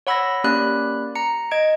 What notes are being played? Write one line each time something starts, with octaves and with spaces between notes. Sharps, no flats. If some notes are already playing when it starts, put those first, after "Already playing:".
C#5 F#5 B5 E6 G#6 A#6
A#3 C#4 G4 D5 B5 F#6
A#5 C#7
D#5 G#6 D7